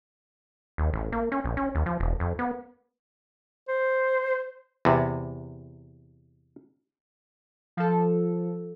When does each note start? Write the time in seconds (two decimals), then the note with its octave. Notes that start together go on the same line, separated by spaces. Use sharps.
0.78 D#2
0.93 A1
1.12 A#3
1.32 C#4
1.44 A#1
1.57 C#4
1.75 D#2
1.86 F3
2.00 E1
2.20 F2
2.39 B3
3.68 C5
4.85 E2 C3
7.77 F3 A4